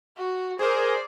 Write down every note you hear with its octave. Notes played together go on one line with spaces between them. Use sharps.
F#4
G#4 A#4 C5 D5